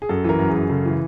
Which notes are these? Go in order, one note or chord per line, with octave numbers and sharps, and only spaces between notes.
G#4
F#2 A4
E3 A#4
F#2
F#2 G#4
C#3 A4
E3